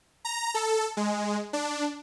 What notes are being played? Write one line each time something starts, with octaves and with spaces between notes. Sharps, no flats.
A#5
A4
G#3
D4